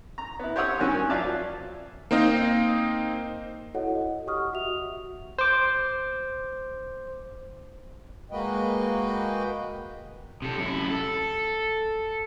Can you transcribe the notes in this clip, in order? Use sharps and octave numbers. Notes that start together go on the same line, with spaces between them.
A#5
B3 E4
G4 C5 C#5 F#5 D#6 E6
G2 D#3 G3 C#4 F#4
G#5
F3 F#3 F4 D5 E5 A5
A#3 C4 D#4 D#5 F5
E4 F#4 A4 C#5 D#5 F#5
D#5
G4 F#5 C#6 D#6 F6
F#4 E5 F7
C5 D6
G#3 A#3 F#4 B4 D#5 G5
C3 A4
F#2 E4
A4